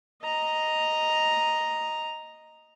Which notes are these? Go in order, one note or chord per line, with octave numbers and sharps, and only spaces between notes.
D#5 A#5